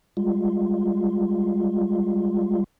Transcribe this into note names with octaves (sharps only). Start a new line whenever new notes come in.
G3 G#3 F4